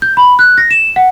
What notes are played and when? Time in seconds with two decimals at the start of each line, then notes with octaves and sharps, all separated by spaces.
0.02 G6
0.17 B5
0.39 F#6
0.58 A#6
0.71 E7
0.96 F#5